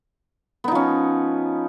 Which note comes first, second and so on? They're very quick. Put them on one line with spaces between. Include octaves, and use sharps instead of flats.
B3 D#4 F3 C#4